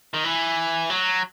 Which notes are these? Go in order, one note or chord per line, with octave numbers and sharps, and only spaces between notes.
D#3
E3
F#3